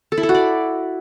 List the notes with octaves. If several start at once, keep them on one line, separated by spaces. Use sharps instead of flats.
A4
E4
A4
F#4
D5